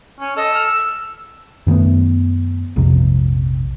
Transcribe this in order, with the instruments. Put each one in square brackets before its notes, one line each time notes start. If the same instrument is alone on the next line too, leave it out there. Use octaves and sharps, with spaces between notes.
[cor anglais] C#4
[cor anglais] A4 [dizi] D#5
[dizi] F6
E6
[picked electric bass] F#2 D#3 A3 B3
A#1 F2 C3